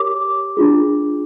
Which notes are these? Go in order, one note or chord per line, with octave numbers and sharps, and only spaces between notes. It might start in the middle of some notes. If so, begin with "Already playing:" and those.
Already playing: G4 A#4 C#5 D6
D4 F4 G#4